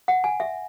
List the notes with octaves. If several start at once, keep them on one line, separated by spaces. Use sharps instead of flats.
F#5
G#5
E5